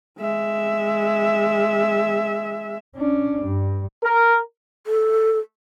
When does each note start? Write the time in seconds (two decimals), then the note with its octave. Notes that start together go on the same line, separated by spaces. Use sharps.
0.19 G#3 E5
2.96 C#4 D4
3.43 G2
4.04 A#4
4.87 A4